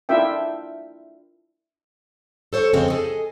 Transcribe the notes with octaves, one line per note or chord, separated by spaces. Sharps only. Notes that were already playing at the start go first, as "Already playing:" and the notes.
D4 E4 F4 A#4 E5 G5
A4 C5 C#5
F2 C#3 G#3 C4
G#4 A4 D#5 G#5